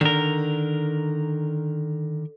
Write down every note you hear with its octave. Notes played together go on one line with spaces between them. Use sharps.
D3 D#3 A#4